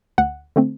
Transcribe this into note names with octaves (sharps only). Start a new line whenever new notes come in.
D2 F#5
D3 A3 C4